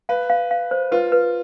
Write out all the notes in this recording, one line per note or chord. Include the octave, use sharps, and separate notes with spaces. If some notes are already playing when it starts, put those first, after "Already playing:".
B4 F5
F5
F5
C5
F4 B4
B4